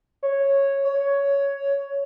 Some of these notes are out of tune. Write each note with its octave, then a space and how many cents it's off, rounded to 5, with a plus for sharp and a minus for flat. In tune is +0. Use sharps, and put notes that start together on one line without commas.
C#5 -5
C#5 +10